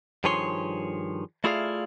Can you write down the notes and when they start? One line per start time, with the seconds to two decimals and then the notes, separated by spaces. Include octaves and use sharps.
0.24 G2 D#3 F3 G#4 C#5 C6
1.44 A3 E4 F4 G#4 D5 F5